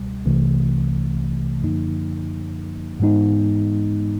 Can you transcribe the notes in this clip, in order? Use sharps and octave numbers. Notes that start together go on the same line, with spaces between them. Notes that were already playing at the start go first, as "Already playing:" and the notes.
Already playing: C#2 B2 G3
C2 C3 E3 A3
F#2 D3 F3 A#3 D#4
G#2 E3 G#3 B3 D#4